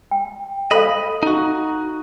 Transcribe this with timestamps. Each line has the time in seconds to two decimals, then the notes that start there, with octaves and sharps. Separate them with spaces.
0.11 G5
0.71 A4 C5 D#5 F5 B5
1.23 D#4 F#4